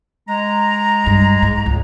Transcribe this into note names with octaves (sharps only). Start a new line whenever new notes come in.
G#3 A#5
G2
G#2
C#2